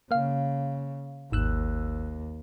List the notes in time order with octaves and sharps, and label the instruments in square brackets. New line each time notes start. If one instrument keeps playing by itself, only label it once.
[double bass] C#3 [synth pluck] A#3 F5
[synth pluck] G#1 E6 F#6 [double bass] D#2